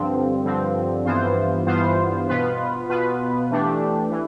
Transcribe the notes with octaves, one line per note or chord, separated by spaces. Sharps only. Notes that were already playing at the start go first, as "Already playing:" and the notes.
Already playing: G2 D3 F3 C4
G2 D3 F3 C4
G2 E3 B3 F4 C5
G2 E3 B3 F4 C5
B2 B3 F4 B4
B2 B3 F4 B4
E3 A3 D4 G4
E3